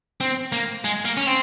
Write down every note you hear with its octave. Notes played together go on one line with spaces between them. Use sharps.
C4
A#3
G#3
A#3
C#4
C4